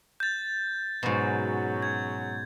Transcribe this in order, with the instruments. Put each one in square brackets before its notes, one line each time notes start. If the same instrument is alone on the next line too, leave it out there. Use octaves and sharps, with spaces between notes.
[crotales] G6 A6
[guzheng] G#2 B2 [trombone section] F#3 C#4 F#4
[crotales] G#6